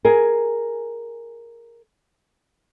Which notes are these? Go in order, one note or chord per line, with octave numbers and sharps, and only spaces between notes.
G#4 A#4 G#5